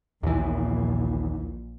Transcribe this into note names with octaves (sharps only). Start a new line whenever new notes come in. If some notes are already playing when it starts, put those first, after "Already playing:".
A#1 D#2 A#2 E3